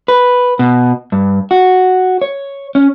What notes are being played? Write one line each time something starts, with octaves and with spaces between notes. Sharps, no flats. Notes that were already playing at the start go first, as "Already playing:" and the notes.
B4
B2
G2
F#4
C#5
C#4